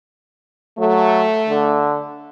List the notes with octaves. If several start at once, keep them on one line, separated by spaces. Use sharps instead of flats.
F#3 A3
D3